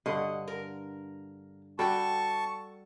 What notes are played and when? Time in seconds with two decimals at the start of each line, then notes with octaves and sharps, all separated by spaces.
0.06 G2 D3 D#5 F#5
0.48 A#4
1.79 G3 F#4 A4 G5 A5 C#6